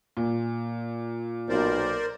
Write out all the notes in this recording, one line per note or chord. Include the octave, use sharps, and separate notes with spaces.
A#2
B1 A#4 C5 D5